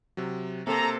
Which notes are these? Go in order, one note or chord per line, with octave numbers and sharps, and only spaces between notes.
C3 F#3
C3 A#3 A4 A#5